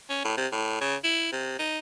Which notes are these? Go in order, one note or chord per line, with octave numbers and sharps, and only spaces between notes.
C#4
A2
C3
A2
C#3
E4
C3
D#4